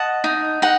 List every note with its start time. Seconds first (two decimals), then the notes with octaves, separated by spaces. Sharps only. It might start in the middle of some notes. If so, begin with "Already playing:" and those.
Already playing: D#5 F#5 A5
0.24 D#4
0.62 D#4 F#5